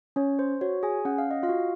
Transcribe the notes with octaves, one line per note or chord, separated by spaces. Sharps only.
C#4 C#5
C5
F#4 C#5
G#4 G#5
C#4 F#5
F5
D#5
F4 F5
F#4